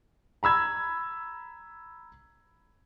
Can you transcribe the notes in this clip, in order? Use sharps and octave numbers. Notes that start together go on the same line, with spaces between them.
A#5 B5 E6 G#6